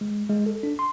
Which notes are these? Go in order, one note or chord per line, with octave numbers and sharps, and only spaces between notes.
G#3
G#3
A4
D4
C6